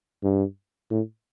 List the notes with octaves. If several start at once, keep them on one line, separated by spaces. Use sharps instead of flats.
G2
A2